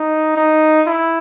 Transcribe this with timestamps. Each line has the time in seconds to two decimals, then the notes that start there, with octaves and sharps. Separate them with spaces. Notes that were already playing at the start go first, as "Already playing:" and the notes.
Already playing: D#4
0.36 D#4
0.87 E4